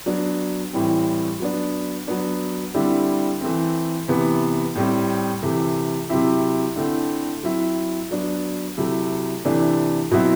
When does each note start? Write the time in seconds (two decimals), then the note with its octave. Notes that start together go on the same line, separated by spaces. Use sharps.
0.06 F#3 B3 D4
0.73 A2 E3 G3 C4
1.40 F#3 B3 D4
2.07 F#3 B3 D4
2.74 D3 G3 C4 E4
3.41 E3 A3 C4
4.08 C3 E3 B3
4.75 A2 G3 C4
5.42 C3 E3 A3
6.10 C3 F#3 C4 E4
6.76 D3 A3 C4 E4
7.43 F#3 C4 E4
8.11 F#3 B3 D4
8.77 C3 F#3 A3 E4
9.45 C3 E3 A3 D4
10.11 B2 F#3 C4 E4